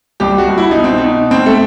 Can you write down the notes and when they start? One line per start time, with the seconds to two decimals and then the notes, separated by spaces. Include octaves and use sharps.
0.20 C2 G4
0.38 F#4
0.48 C2
0.58 E4
0.71 B2 D#4
0.84 C4
0.98 D#4
1.04 B2
1.30 D#2 C4
1.46 A3